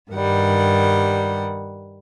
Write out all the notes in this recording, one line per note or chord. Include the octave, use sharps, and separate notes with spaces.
G2 D#3 G3 F#5